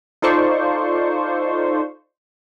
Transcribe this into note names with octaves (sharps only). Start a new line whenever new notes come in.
D#4 F4 A4 C5 D5 C#6